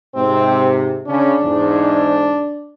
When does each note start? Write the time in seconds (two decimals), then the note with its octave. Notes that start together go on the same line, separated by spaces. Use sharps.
0.15 G#2 C3 C4
1.08 C#3 C#4 D4
1.42 E2 G#2